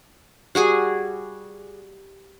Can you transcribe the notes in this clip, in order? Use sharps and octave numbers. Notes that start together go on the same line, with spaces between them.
G3 F#4 G#4 G#5